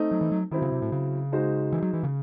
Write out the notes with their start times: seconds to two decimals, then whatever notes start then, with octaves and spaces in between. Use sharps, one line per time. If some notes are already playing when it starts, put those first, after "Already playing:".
Already playing: A3 C4 D#4
0.11 F#3
0.21 E3
0.32 F#3
0.51 D#3 F#3 C4 E4
0.62 C#3
0.72 C3
0.82 A2
0.92 C#3
1.32 G#3 D#4 F#4 C5
1.72 E3
1.82 F#3
1.93 E3
2.03 C#3